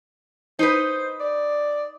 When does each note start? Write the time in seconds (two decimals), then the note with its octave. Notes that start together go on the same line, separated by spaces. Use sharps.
0.59 D#4 B4 C5
1.20 D5